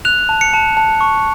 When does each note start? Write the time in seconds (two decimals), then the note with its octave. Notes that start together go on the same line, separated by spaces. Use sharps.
0.05 F#6 F7
0.29 A5
0.41 C#7
0.53 A5
0.77 A5
1.01 C#6